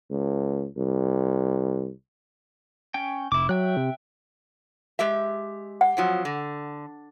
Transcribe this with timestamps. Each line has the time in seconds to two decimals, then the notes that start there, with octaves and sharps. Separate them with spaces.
0.11 C#2
0.77 C2
2.94 C#4 G5
3.32 F1 E4 D6
3.49 F#3 E5 G5 F#6
3.77 C3
4.99 G#3 G4 E5
5.81 F#5
5.97 F2 F3 F#3
6.25 D3